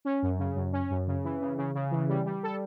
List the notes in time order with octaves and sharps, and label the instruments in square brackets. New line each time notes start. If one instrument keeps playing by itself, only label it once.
[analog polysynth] C#4
F#2
C#3
F#2
C#4
F#2
C#3
E3
C#3
C#3
C#3
E3
G3
G3
A4